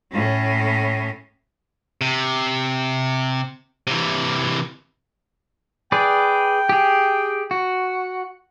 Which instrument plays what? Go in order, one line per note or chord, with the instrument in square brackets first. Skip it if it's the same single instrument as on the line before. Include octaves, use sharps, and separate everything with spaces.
[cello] A2 C#4
[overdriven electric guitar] C3
C3 E3
[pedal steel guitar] G#4 B4 D5 [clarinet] G5
[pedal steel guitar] G4 G#4
F#4